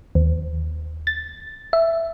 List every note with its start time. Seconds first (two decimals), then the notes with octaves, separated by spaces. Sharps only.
0.15 D#2
1.07 A6
1.73 E5